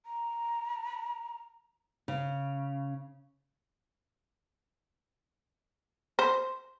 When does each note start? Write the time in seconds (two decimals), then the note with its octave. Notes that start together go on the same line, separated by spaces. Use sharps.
0.06 A#5
2.08 C#3
6.19 C5